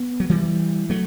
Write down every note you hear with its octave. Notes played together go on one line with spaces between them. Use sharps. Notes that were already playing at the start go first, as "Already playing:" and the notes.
Already playing: B3
F#3
E3 G3
F#3 A3